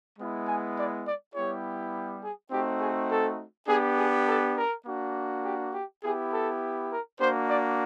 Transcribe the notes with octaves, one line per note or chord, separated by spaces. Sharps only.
G#3 B3 E4
G#5
D5
D5
G3 B3 E4 G4 C#5
G#4
A3 C4 D#4 F#4 G4
G#4
A4
B3 D4 G4 G#4
G#4
A4
A#4
A#3 D4 F#4
G4
G4
B3 E4 G4 G#4
A4
A#4
A#3 D4 F#4 C5
D5